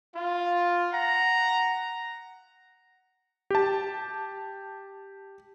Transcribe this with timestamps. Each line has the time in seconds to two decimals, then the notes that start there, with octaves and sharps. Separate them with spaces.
0.15 F4
0.93 F#5 A#5
3.50 G4 A5